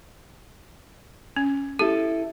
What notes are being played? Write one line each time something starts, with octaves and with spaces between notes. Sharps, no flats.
C#4
E4 G4 A4